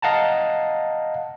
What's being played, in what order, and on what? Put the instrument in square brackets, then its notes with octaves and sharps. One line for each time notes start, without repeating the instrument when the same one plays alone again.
[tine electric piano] D#5 F5 F#5 A5 A#5